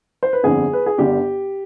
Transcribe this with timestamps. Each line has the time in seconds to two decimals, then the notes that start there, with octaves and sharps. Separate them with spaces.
0.23 C5
0.33 B4
0.43 G1 F2 D3 G#4
0.73 B4
0.86 G#4
0.98 G1 G2 D3 G4